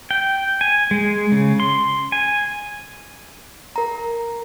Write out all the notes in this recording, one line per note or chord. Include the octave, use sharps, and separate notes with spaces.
G5
G#5
G#3
C#3
C6
G#5
A#4 A#5